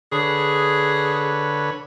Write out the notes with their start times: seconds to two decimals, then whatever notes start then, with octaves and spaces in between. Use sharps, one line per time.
0.12 D3 G#4 B4 C#5